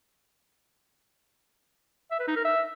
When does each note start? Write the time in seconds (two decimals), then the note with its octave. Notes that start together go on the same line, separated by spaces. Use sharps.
2.11 E5
2.20 B4
2.28 D#4
2.36 A#4
2.45 E5